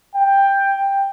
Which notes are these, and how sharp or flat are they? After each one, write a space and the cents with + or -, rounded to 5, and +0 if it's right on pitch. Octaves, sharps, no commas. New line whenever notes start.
G5 +10